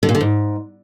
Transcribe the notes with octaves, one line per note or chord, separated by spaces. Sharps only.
D3
A#2
D3
G#2